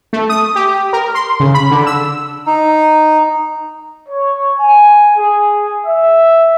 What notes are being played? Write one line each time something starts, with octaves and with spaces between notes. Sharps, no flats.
A3
D#6
G4
A#4
C6
C#3
B5
D3
E6
D#4
C#5
G#5
G#4
E5